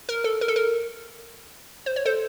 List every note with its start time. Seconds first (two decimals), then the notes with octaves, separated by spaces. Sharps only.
0.09 A#4
0.24 A4
0.41 A#4
0.48 A4
0.56 A#4
1.86 C5
1.96 C#5
2.05 A4 C5